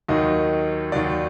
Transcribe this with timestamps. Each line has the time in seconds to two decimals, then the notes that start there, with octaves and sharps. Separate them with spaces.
0.09 D#2 D#3 F#3 D#5
0.92 D#2 D#3 F#3 D5